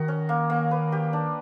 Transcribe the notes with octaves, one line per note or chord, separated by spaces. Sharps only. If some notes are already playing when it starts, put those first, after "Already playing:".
Already playing: D#3 F#4
C#4
A#3
A#3
B4
G4
D4